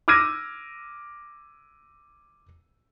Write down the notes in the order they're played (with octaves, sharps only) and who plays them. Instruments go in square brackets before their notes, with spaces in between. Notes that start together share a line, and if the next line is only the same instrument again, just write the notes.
[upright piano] D6 E6 F6 G#6 A#6 D#7